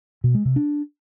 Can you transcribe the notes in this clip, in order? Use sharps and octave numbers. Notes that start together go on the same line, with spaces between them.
B2
G#3
C3
D4